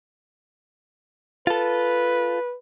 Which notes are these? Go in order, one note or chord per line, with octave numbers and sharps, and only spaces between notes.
F4 A4 B4